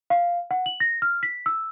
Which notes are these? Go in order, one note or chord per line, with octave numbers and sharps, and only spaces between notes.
F5
F#5
F#7
A#6
F6
B6
E6